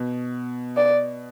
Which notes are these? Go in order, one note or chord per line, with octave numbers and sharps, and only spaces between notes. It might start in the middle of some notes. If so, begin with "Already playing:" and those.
Already playing: B2
D5